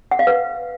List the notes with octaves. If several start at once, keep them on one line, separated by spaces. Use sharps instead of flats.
F#5
F5
B4